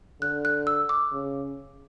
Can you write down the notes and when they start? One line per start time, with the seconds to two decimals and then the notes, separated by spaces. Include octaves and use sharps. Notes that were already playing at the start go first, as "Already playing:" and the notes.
0.21 D3 F#6
0.45 F#6
0.67 E6
0.89 D6
1.13 C#3